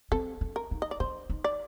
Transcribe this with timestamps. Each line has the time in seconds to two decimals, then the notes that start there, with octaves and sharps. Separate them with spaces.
0.12 C4 A4
0.41 D4
0.56 A#4
0.71 D#4
0.82 D#5
0.91 D5
1.00 D4 C5
1.30 D#4
1.44 D5